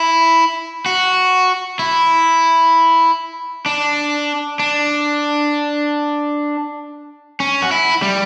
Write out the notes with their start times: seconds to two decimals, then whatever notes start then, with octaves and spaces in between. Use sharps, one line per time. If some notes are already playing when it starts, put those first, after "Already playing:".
Already playing: E4
0.86 F#4
1.79 E4
3.66 D4
4.59 D4
7.40 C#4
7.62 F#4
7.71 E4
8.02 G3